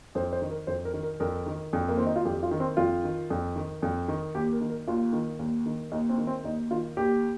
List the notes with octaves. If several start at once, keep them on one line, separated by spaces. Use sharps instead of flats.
F2 C5
C5
D#3
A#4
F2 C5
A#4
D#3
A#4
F2 A#4
D#3
F2
A#3
D#3 C4
D#4
F4
F2 G4
F4
D#3
C4
F2 F4
D#3
F2
D#3
F2
D#3
D#2 G4
A#4
D#3
A#4
D#2 F4
D#3
D#2
D#3
D#2 D#4
C4
D#3
C4
D#2 D#4
D#3 F4
D#2 G4